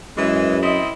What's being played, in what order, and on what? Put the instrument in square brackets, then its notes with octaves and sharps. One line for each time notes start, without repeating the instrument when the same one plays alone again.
[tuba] F#2 [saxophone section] E3 G#3
[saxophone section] C4 E4 D#5